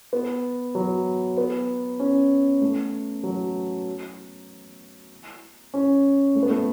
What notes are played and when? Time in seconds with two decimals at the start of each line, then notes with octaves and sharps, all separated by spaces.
0.13 B3
0.75 F#3
1.37 B3
2.00 C#4
2.62 A3
3.23 F#3
5.74 C#4
6.35 A3
6.43 B3
6.50 A3